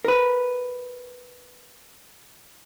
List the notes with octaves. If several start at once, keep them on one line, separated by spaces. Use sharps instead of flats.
A#4 B4